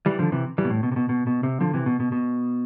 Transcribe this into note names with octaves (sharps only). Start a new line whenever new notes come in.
E3 G3
D3 F3
C3 E3
E3 G3
B2
A2
B2
C3
B2
B2
B2
C3
D3 F3
C3 E3
B2
B2
B2